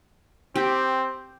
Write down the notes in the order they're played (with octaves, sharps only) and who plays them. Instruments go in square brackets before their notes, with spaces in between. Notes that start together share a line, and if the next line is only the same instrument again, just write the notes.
[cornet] C4 [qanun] G4